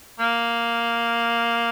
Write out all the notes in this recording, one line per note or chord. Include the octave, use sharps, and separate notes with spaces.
A#3